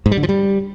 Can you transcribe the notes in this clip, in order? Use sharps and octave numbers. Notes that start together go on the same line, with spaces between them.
G#2
G3
D3
F3
G3